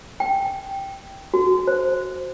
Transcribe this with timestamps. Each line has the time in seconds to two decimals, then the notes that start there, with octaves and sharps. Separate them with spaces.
0.20 G5
1.34 F#4
1.67 C5